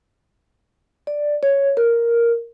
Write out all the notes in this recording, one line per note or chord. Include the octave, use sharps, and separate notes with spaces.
D5
C#5
A#4